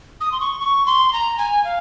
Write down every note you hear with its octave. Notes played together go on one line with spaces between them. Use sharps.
D#6
C6
C#6
C#6
C6
A#5
G#5
F5